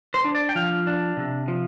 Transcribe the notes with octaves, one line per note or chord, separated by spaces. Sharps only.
C5
D4
D5
G5
F3 F5
D4
C3
F3